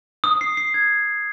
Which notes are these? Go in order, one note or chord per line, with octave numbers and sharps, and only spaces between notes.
D#6
C7
C7
G#6